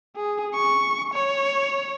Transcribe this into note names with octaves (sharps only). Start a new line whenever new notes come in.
G#4
C#6
C#5